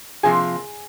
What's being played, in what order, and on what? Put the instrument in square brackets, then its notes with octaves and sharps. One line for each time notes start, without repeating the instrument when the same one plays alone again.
[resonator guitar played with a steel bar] C3 F3 A#3 F4 [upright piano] G#4 G#5